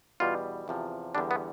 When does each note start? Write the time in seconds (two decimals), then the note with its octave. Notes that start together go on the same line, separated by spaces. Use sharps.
0.20 E2 B2 G3 F4
0.68 E2 C3 F3
1.15 E2 D3 G3 D4
1.31 B3